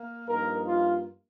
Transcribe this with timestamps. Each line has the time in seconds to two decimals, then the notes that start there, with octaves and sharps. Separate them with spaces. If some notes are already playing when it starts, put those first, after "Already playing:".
Already playing: A#3
0.27 G2 F3 A#3 D#4 A#4
0.67 F4